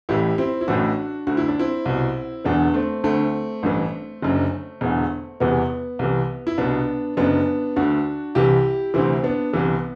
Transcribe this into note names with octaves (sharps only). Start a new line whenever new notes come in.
A1 A2 E3 E4 G4
C4 E4
E4
A1 A2 E3 D4 F#4
D2 D3 F#4
E4
D4
C4 E4
C2 B2
E1 E2 D3 B3 D4
A3 C4
D2 D3 A3 C4
A1 G2 E3
F#1 F#2 D3
E1 E2 D3
E1 E2 C3 E3 B3
C2 C3 E3
E4
C2 B2 B3 D4
F#1 F#2 D3 B3 D4
D2 D3 D4 F#4
C2 C3 E3 E4 G4
D2 C3 E3 C4 E4
B3 D4
C2 C3 E3 B3